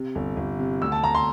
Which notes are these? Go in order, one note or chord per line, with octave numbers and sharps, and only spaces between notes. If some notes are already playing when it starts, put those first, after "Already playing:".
Already playing: C3
G1
G1
C3
D2 E6
A5
D2 A#5
C6